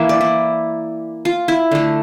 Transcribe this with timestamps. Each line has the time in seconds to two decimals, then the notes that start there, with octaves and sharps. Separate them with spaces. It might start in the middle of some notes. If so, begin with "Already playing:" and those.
Already playing: E3 A#3 E5
0.09 D5
0.21 E4
1.25 F4
1.48 E4
1.71 D3 A3